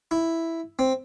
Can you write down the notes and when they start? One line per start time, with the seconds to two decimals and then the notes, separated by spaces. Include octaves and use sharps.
0.11 E4
0.79 C4